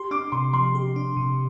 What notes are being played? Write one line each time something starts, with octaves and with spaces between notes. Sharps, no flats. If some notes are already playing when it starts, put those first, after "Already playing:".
Already playing: G4 C6
D4 D6
C3 C6
F3 C6
G4
D4
C3